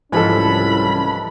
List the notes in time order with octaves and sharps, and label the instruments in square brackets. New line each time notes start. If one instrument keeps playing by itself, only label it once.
[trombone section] C2 G3 C#4 [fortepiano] G#2 F3 A4 [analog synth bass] E3 [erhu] B5